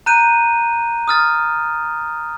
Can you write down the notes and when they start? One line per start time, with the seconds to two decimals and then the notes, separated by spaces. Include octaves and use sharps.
0.06 A#5 F#6 G6 D#7
1.08 D#6 F6 A6